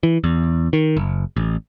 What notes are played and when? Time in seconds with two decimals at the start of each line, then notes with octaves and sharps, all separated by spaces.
0.03 E3
0.24 E2
0.73 D#3
0.97 F#1
1.36 A1